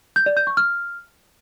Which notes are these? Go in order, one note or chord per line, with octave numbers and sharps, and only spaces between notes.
G6
D5
G6
C#6
F6